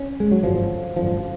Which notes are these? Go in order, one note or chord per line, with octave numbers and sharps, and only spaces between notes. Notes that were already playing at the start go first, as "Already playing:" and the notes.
Already playing: C#4
G#3
F#3
G#1 F#2 D3 F3
G#1 F#2 D3 F3